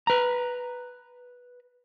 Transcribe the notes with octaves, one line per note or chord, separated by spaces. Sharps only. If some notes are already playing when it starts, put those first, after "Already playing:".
B4 A#5